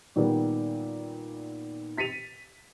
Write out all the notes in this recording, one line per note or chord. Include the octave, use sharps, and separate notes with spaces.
A#2 D#3 G3 B3
A6 B6 C#7 D#7 F7